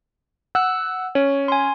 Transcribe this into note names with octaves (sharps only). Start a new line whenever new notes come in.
F#5 E6 F#6
C#4 C#5
G#5 C6